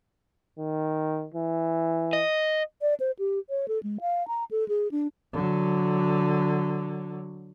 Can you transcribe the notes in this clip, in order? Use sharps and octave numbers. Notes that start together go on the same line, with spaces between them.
D#3
E3
D#5
D5
C5
G4
C#5
A4
G#3
F5
A#5
A4
G#4
D4
D3 F#3